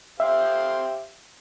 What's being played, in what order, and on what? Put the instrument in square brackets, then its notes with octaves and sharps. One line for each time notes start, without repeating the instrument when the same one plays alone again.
[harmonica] G4 C5 F5 [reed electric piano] E5